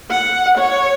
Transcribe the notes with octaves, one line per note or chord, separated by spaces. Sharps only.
F#5
C#5